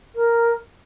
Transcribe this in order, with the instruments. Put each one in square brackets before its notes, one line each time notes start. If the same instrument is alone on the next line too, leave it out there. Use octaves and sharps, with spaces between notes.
[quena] A#4